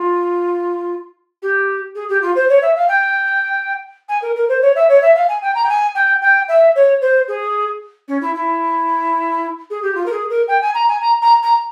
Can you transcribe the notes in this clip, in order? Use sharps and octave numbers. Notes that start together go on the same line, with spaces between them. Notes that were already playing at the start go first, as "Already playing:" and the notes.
Already playing: F4
G4
G#4
G4
F4
C5
C#5
E5
F5
G5
G#5
A#4
A#4
C5
C#5
E5
C#5
E5
F5
G#5
G5
A#5
G5
G#5
G5
G5
E5
C#5
C5
G#4
C#4
E4
E4
G#4
G4
F4
A#4
G#4
A#4
G5
G#5
A#5
G#5
A#5
A#5
A#5